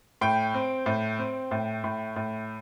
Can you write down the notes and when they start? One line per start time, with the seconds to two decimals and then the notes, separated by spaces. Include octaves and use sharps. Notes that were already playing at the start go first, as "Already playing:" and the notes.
0.21 A2 G5
0.54 C4
0.86 A2
1.19 C4
1.51 A2
1.84 A2
2.16 A2